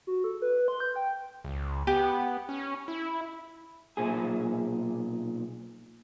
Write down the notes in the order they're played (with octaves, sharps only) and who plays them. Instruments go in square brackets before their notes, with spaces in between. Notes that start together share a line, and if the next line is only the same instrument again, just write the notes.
[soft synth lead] F#4
A4
B4
C6
G6
G5
[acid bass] C#2
[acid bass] B3 [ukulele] G4
[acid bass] C#4
E4
[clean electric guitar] B1 A#2 G#4